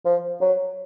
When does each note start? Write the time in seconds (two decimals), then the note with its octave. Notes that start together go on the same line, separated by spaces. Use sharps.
0.05 F3
0.41 F#3